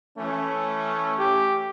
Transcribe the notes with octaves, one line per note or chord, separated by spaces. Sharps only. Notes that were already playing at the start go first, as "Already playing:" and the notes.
E3 A3 C#4
G4